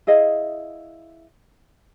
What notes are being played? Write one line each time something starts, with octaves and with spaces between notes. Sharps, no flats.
E4 G#4 D#5 F5